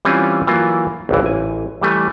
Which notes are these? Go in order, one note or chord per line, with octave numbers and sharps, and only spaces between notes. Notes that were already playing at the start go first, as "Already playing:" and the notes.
E3 G3 C4 C#4 F4 G#5
E3 F#3 A#3 F4
G#1 C#2 E3
A1 G#5
E3 G3 A3 B4